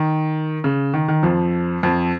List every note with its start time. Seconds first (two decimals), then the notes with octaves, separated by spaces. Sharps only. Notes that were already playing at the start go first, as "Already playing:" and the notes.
Already playing: D#3
0.64 C#3
0.94 D#3
1.08 D#3
1.23 F2 F3
1.83 F2 F3